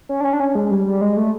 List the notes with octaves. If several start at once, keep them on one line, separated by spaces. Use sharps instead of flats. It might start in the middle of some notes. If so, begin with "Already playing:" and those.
C#4
D4
C#4
D4
C#4
G#3
G3
G3
G#3
A3